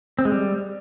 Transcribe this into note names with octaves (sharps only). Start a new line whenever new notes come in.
C4
G#3
G3